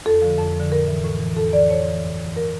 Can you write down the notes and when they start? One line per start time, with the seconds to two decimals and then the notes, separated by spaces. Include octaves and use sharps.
0.06 F2 A4
0.22 D3 F3
0.38 F2
0.55 D3 F3
0.71 A2 A#4
0.88 E3
1.04 A2
1.20 E3
1.37 F2 A4
1.53 E3 D5
1.70 F2 C#5
1.87 E3
2.03 G2
2.20 E3
2.36 A#4